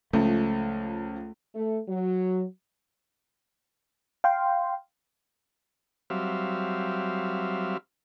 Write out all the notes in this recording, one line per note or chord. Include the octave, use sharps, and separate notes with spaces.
C#2 F3 A3
A3
F#3
F5 G5 C6
F#3 G3 C4 E5 F5